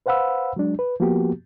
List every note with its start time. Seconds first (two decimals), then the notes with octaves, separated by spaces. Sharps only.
0.06 B4 C5 F5 F#5 B5 E6
0.56 F#3 G#3 D4
0.79 B4
1.00 F3 A#3 B3 F#4 G4